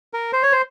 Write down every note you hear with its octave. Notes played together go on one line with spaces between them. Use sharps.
A#4
C5
C#5
C5